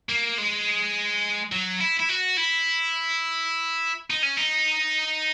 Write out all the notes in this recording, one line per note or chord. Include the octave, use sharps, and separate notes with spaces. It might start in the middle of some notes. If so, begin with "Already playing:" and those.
A#3
G#3
F#3
E4
E4
F#4
E4
D#4
C#4
D#4